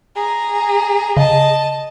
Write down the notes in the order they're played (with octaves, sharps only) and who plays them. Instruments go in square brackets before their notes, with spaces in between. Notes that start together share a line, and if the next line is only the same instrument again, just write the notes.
[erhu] G#4 [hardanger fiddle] A#5
[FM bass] C#3 [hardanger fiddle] D#5 A5